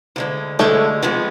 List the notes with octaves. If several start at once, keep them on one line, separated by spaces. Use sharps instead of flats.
D2 D3 G#3
D2 D3 G#3 A3
F2 F3 G#3 B3